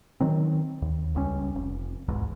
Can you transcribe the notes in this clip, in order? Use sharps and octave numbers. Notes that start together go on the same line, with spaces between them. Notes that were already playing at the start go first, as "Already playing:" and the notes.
D#3 F#3 C4
D#2
F#1 C#2 G3 C#4
F1
D1 B1 E2 G#2